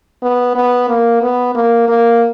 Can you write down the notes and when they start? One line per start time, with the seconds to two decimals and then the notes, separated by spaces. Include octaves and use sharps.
0.22 B3
0.55 B3
0.89 A#3
1.22 B3
1.55 A#3
1.89 A#3